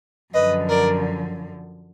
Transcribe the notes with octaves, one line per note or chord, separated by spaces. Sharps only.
F#2 D3 F3 B4 D#5
A#4 D5